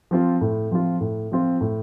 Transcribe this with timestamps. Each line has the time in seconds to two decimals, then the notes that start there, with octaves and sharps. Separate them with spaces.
0.11 F3 C4 F4
0.41 A2
0.71 F3 C4 F4
1.01 A2
1.32 F3 C4 F4
1.61 A2